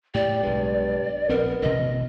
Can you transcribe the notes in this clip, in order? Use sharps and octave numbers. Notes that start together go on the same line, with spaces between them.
A2 G4 D5
B1 G2 G#3
A#1 B3 C4 A#4
A1 B2 D#5